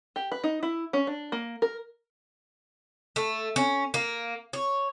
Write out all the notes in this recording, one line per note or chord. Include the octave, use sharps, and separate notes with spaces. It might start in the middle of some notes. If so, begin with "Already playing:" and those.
G4
B4
D#4
E4
C#4
D4
A#3
A#4
A3
C#4
A#3
C#5